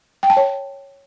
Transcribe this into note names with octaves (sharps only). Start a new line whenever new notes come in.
G5
A5
C#5